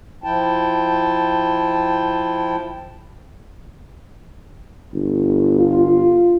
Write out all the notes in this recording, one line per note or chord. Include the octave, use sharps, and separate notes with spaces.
F3 E4 G5 A5
G1
F4